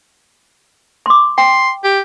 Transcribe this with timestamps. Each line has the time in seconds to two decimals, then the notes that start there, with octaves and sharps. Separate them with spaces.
1.06 C6 D6
1.38 G5 C6
1.84 G4